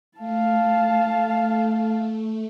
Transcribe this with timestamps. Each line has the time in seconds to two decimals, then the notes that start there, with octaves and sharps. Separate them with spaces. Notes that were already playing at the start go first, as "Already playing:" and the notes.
0.18 A3 F5 A5